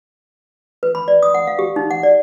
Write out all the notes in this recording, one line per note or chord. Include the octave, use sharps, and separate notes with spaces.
B4
B5
D5
D#6
F#5
F5
G4
D#4
F#5
D5